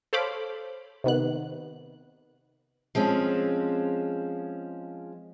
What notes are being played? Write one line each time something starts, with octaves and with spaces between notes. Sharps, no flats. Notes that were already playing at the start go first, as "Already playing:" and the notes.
A4 C5 C#5 F5 B5 D6
C3 D#3 B3 F#6
F3 G#3 C4 C#4